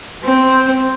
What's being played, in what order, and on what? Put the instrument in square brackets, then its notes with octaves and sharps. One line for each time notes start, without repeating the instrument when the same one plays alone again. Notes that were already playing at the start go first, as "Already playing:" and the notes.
[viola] C4